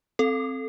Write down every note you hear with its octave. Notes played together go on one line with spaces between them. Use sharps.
C4 A4